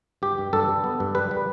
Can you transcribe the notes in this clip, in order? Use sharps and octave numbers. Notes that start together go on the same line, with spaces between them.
G2 G4
G2
G2 A4
G3
B3
G2
G3 B4
G3